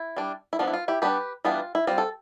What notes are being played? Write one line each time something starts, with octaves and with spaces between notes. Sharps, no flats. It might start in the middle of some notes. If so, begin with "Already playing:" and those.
Already playing: E4
G3 D4
E4
F3 B3 D4 F4
E4
F4
E4 G4
G3 B3 D4 G4 B4
E3 G3 B3 D4 F4
E4
G3 C4 F4
A4